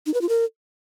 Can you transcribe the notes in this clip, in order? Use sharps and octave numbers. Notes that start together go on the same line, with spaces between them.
D#4
B4
F4
A#4